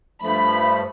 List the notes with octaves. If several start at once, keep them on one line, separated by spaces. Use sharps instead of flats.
G2 F3 A3 B5